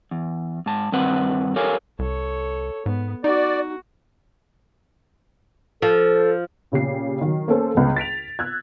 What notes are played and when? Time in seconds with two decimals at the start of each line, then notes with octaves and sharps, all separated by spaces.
0.11 E2
0.66 G#2 A5
0.92 G2 D#3 C4 B4 F#5
1.56 G4 A4 A#4 C#5 F5 G#5
1.99 C2 A4 C#5
2.86 G#2 B3
3.24 D#4 F#4 D5
5.82 F3 A4
6.72 A#2 C#3 G4 C7
7.21 D#3 F#3
7.48 A#3 C#4 A4 C5
7.75 G1 C#2 B3
7.96 A6 B6 D7 F7
8.39 E6 F#6 G#6